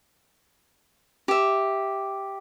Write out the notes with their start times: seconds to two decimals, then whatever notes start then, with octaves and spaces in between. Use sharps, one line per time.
1.28 G4 E5